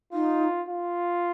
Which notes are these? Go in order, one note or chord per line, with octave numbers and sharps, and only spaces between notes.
D#4 F4
F4